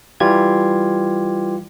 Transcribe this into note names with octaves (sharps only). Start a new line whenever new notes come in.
E3 G3 F4 G4 G#6